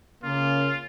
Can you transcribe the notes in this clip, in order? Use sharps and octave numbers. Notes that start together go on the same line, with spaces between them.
C#3 A#3 C#4 F4